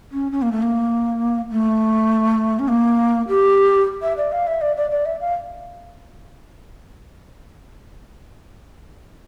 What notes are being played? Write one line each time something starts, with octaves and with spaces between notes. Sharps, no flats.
C#4
C#4
A#3
A3
A#3
A3
C#4
A#3
G4
E5
D5
F5
E5
D5
D5
D5
E5
F5